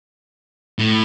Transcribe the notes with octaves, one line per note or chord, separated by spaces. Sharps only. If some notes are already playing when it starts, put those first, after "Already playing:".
A2